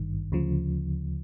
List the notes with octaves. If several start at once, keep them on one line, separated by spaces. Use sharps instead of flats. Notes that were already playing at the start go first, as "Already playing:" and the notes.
Already playing: G#1 G2 D#3
D2 C#3 F3